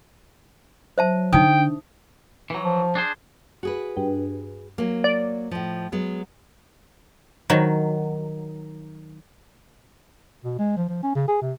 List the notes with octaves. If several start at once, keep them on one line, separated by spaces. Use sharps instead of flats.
F#3 C5 E5 A5
D3 D#4 G5 D#6
D4
E3 F#3
F3
D4 G#4 C5
F#4 G#4 B4
G2
F#3 A#3
D5
A2 F3
F#3 G#3 B3
D#3 F#3
B2
G#3
F3
F3
C#4
C#3
G#4
C3